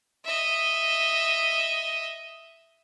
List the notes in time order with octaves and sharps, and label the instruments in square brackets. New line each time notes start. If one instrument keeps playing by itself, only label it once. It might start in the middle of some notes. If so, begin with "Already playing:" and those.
[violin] D#5 E5